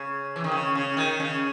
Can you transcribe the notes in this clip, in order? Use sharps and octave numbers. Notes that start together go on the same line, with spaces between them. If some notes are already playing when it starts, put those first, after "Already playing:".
Already playing: C#3
E3
D#3
C#3
C#3
D#3
C#3